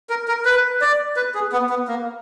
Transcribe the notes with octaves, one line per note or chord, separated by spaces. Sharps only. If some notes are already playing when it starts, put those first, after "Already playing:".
A#4
A#4
B4
D5
B4
G#4
B3
B3
A#3